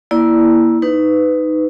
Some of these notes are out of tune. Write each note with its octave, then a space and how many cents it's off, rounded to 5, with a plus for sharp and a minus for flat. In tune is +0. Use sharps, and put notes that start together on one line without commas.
A#3 +30 E4 +0 D5 -5
D#4 +0 B4 +20